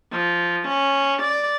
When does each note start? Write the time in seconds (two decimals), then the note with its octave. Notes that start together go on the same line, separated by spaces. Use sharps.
0.12 F3
0.68 C#4
1.23 D5